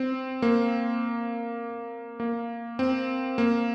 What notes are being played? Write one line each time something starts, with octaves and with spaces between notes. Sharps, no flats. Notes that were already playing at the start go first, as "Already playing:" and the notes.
Already playing: C4
A#3
A#3
C4
A#3